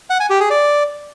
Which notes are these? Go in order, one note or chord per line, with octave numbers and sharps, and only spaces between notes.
F#5
G#5
G4
G#4
D5